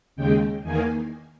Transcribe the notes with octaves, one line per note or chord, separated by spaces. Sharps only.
D#2 C#3 G#3 G5
E2 D#3 A#3 G#5